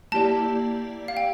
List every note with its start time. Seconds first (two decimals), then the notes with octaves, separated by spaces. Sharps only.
0.12 A#3 E4 G4 D5 A5
1.08 F5
1.17 G5